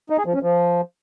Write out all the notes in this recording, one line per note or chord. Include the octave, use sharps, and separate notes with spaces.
D#4
G#4
F3
C#4
F3